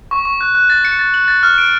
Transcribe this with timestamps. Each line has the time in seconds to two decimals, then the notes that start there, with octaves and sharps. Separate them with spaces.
0.11 C#6
0.25 C#6
0.41 F#6
0.55 F#6
0.70 A6
0.85 C#7
0.99 A6
1.14 F#7
1.28 A6
1.43 F6
1.58 D7